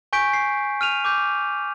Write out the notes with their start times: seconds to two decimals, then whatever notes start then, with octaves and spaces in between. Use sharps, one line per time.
0.13 G#5 C#6 G6 B6 D7
0.33 C7
0.81 F6 D#7 F7
1.05 D6 G6